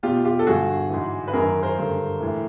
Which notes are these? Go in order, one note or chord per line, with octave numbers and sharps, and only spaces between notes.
E2 B2 F4 G4
F4 G4
A4
G2 D3 F#4 G#4
G#2 E3
B4
F#2 D#3 G#4 A#4
A#4 C5
G2 D3
A2 E3